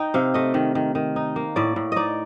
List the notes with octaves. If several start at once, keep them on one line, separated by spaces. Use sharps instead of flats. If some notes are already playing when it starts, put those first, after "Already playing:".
Already playing: D#4 G5
C3 F5
A3 D#5
D#3
D#3
D#3
D#4
A#3
A2 D5
A2
D#4 D5 D#5